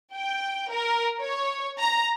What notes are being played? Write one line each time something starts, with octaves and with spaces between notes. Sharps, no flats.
G5
A#4
C#5
A#5